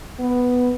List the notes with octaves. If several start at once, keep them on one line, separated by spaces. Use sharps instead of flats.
B3